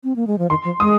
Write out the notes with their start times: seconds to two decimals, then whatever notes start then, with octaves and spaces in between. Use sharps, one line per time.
0.04 C4
0.16 A#3
0.27 G#3
0.39 F3
0.50 D#3 C6
0.65 F3
0.80 G#3 D#6